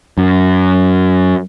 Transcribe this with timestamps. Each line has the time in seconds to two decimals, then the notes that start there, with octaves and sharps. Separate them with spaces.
0.18 F#2